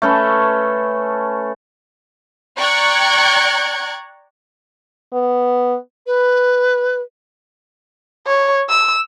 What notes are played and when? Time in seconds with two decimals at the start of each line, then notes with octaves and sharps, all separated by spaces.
0.02 A3 C#4 A4 B4
2.58 D5 G5 A#5 C#6 F#6 G#6
5.13 B3
6.06 B4
8.27 C#5
8.69 E6